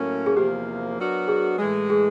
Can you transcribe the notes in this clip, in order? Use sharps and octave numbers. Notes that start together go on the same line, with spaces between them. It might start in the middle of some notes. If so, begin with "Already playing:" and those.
Already playing: A2 F#3 A#3 C#4
G#4
E2 C3 F3 A#3 G4
F#3 B3 D4 F#4 A#4
G#4
A2 E3 G#3
G#4